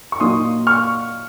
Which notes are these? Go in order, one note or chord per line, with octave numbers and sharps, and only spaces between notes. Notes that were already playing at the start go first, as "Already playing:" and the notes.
C#6
A#2 F#3 A#3 D#4 C6 D#6
C#6 F6